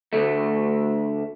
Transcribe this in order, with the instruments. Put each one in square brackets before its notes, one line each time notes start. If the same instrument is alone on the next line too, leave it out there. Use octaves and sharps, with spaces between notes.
[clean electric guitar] D2 A3